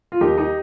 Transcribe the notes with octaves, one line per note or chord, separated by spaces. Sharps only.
F4
D#2 D#4 G4
D#4 G4